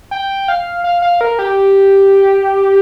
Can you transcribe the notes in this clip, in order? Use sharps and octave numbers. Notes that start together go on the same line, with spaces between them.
G5
F5
F5
F5
A#4
G4